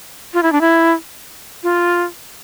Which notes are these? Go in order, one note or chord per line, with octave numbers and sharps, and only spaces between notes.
F4
E4
D4
E4
F4